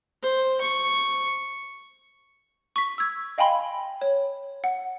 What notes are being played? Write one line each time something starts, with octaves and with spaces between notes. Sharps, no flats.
C5
C#6
C#6 B6
E6 G#6
D#5 F5 G5 G#5 B5 C6
C#5
F#5